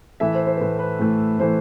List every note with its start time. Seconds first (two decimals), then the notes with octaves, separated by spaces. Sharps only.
0.20 A2 E3 A3 E5
0.35 C5
0.46 C5
0.57 A2 E3 A3 B4
0.79 B4
0.99 A2 E3 A3
1.39 A2 E3 A3 C5